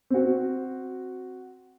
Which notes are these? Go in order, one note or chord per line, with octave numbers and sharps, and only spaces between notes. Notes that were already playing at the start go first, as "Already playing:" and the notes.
C4 F#4